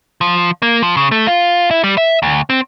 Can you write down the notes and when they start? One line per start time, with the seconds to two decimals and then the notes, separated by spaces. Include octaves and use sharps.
0.21 F3
0.62 A#3
0.83 F3
0.97 C#3
1.12 A3
1.27 F4
1.71 E4
1.84 G3
1.97 E5
2.23 D2
2.50 C4